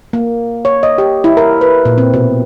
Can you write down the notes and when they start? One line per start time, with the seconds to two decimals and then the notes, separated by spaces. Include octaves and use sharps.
0.13 A#3
0.65 C#5
0.83 D#5
0.98 G4
1.24 E4
1.37 A#4
1.61 B4
1.85 A#2
1.98 C4
2.14 B2